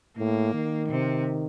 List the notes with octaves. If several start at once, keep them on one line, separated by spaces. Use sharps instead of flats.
A2 A#3
D#3
C3